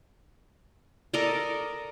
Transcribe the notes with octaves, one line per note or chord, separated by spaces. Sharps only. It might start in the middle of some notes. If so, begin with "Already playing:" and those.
A4 A#4 D5 D#5